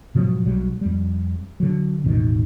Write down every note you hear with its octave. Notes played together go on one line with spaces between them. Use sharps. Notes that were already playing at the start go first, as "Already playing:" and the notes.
G#2 B2 F3 F#3
B1 F#3 G3
F2 G3
D3 F#3
E1 A1 B2 D#3